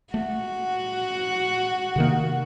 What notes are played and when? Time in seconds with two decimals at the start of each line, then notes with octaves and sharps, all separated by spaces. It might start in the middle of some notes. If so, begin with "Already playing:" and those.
0.14 A3 F#4
1.96 C3 D#3 A#3